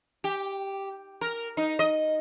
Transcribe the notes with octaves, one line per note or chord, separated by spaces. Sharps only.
G4
A#4
D#4
D#5